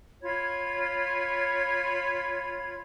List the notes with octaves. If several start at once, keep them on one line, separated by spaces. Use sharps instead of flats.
F4 C#5 B5 G#6